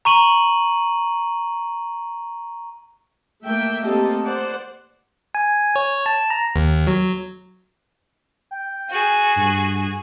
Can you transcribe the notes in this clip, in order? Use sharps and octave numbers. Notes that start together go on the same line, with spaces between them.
A#5 C#6 D#7 F#7
A3 A#3 E5 G5
A3 A#3 C4 G4 A4 D#5
C5 D5 F#5
G#5
C#5
A5
A#5
D#2
F#3
G5
F#4 G#4
G2